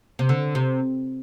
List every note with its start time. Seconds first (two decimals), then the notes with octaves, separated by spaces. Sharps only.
0.19 C3
0.29 D3
0.55 C3